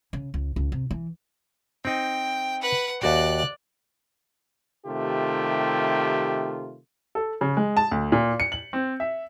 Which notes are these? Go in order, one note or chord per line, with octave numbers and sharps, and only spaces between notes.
C#3
C#2
C#2
C3
E3
C4 D#4 G5
B4 F#5
D#2 F#4 D5 G5 F#6
C3 D#3 A3 F4 G4
A4
C#3
G#3
A5
D2
A#2
C#7
F#7
C4
E5